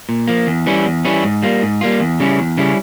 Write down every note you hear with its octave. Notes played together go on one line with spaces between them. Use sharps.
A#2
F3 A#3
E2
E3 G3 C#4 E4
E2
E3 G3 C#4 E4
G#2
G3 A#3 F4
G#2
G3 A#3 F4
E2
C#3 G3 C#4 E4
E2
C#3 G3 C#4 E4